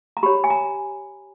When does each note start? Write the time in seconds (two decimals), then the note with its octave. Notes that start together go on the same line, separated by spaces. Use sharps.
0.17 A#5
0.23 G4 C#5 B5
0.44 G#5
0.50 A#5